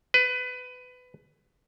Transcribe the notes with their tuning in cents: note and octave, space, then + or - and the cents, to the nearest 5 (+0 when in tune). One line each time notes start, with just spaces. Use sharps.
B4 +20